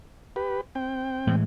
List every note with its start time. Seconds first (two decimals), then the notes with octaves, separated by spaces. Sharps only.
0.36 G4 B4
0.75 C4 G5
1.27 A2 E3 G#3